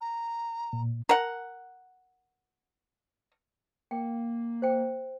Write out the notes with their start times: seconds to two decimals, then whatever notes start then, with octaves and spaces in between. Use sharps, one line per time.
0.01 A#5
0.73 A#2
1.09 A#4 F#5
3.91 A#3 G5
4.62 C5 G5